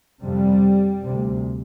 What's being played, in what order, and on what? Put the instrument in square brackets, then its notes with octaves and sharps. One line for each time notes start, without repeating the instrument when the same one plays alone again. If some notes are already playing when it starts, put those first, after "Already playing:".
[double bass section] F2 C3 G3
D2 C3